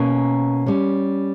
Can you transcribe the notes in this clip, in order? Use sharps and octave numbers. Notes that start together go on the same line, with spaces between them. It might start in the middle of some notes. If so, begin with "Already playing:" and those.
Already playing: B2 A#3 C#4 G#5
G3 C#4